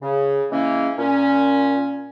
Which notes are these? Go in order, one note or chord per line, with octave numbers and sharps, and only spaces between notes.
C#3
E3 G#3 A#3 C#4
A#2 C#4